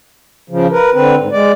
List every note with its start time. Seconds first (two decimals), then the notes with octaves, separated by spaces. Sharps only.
0.50 C#3 F3
0.71 A#4 B4
0.94 D3 C4 B4
1.18 G#2
1.32 G#3 D5